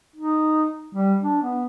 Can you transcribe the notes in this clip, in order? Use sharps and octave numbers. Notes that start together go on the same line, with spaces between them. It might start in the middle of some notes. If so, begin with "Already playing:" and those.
D#4
G3
D4
B3